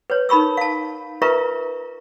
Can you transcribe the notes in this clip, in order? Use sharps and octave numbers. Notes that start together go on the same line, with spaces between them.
B4 C#5
D#4 A#4 B5 C#6 E6
F5 A5
F4 A#4 B4 E5 A#5 C#6